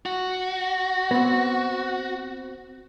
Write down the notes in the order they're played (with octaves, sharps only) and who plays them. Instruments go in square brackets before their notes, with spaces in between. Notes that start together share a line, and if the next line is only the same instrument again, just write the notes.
[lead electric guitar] F#4
[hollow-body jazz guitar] B3 C4